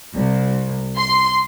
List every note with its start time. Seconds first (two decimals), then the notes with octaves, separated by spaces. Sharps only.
0.14 C2
0.98 C6